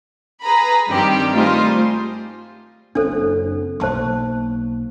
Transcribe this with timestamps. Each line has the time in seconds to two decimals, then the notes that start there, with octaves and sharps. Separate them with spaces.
0.42 G#4 B4 A#5 B5
0.88 G2 D#3 G3 C4 G4
1.31 G3 A3 D#4 F4 G#4 C5
2.95 F#1 C4 D4 A4 C5
3.80 B1 A#3 C5 A5 C#6